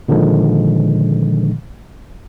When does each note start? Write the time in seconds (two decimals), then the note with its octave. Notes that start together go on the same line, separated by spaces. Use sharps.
0.08 A#2 D3 D#3 F3 G#3